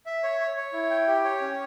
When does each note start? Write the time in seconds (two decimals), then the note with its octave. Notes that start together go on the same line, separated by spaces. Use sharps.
0.06 E5
0.23 C#5
0.40 C#5
0.57 C#5
0.73 E4
0.90 G5
1.07 G4
1.24 C#5
1.41 C#4